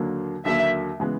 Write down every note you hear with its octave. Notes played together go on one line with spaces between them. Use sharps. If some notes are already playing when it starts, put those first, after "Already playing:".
Already playing: D#2 D3 F#3 A#3
D#2 D3 F#3 A#3 E5
C#3 E3 G#3 B3